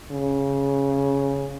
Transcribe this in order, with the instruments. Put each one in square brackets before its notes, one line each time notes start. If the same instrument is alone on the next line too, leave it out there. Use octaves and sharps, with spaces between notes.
[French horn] C#3